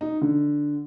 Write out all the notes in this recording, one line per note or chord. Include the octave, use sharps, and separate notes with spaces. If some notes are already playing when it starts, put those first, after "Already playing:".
D#4
D3